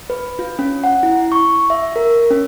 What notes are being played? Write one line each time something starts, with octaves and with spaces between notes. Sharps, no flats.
B4
F4
C#4
F#5
E4
C#6
E5
A#4
C#4